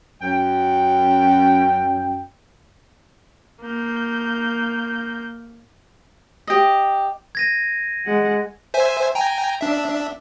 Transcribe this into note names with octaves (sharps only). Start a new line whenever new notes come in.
F#2 G5
A#3 G6
G4 D#5
G#6 A#6 D#7
G#3 F#5
C5 E5 G#5
G5 G#5 A#5
D4 E5